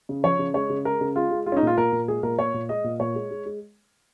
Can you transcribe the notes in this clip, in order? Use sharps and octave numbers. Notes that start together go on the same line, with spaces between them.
C#3
F3 C#5
C#3
G#3 C#5
C#3
G#3 A#4
C#3
G#3 F4
G#3
G#3 F4
C#4
D#4
A#2 F4
A#2 A#4
A#2
G#3 G#4
A#2 A#4
A#2 C#5
A#2
G#3 D#5
A#2
A#2 C#5
G#3
G#3
G#3